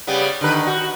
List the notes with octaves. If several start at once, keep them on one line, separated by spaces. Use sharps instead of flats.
C#3 G3 B3
D3 D#3 B4
F#4